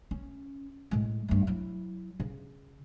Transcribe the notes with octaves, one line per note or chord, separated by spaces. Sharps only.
C#4
A2 G#3
G2 A3
F#3 E4
C#3